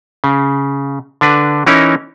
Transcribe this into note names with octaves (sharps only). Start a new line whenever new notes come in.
C#3
D3 D4 B4
E3 C#4 D#4 E4 A#4 C#5